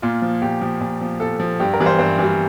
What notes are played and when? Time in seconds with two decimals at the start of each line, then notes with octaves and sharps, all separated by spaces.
0.02 A#2 F4
0.22 F3
0.42 A#2 G4
0.61 F3
0.81 A#2
1.01 F3
1.20 A#2 A4
1.40 F3
1.60 G2 G4
1.73 A#4
1.80 E3 G3
1.86 C5
1.98 G2 C5
2.19 E3 G3